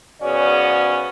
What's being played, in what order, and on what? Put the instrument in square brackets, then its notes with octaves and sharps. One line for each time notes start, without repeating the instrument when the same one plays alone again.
[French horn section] G#2 C#3 B3 C#4 F#4 D5